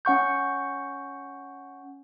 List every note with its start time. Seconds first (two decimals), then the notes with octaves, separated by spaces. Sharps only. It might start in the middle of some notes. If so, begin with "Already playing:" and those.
0.05 C#4 F#5 C#6 G6